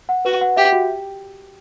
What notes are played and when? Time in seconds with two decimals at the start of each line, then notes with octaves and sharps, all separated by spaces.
0.09 F#5
0.25 F#4 B4
0.41 F#5
0.57 G4 E5
0.72 F#4